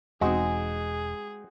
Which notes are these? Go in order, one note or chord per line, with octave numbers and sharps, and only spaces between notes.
E1 G#3 C4 D#4 F#4 G#4